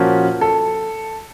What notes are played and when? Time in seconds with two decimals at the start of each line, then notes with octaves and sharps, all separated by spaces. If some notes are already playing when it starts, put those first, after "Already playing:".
Already playing: A#2 F3 A#3 C#4 F#4
0.41 A4